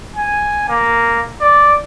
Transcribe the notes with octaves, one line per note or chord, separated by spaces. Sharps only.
G#5
A#3
D5